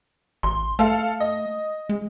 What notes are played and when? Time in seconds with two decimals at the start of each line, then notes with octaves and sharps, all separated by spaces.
0.43 A1 C6
0.79 A3 A4 F5
1.20 D#5
1.89 G#3